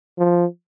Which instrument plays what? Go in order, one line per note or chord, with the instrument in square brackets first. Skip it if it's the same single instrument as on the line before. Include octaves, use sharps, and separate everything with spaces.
[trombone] F3